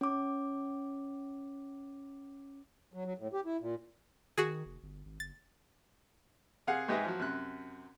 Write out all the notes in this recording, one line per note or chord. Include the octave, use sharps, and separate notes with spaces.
C#4 D6
F#3
F#3
A2
G4
E4
A#2
D#3 F#4 G#4
F1
G1
G#1
F#1 A6
C3 G#4 F5 F#5 G#5
G#2 G#3 G4 G#4 B4 E5
F3 F#3
F#2 C3 F#6